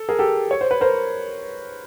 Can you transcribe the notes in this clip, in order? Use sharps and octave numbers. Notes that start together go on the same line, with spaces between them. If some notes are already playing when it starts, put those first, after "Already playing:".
Already playing: A4
G#4 A#4
G4 A4
C#5
C5
B4
A#4 C5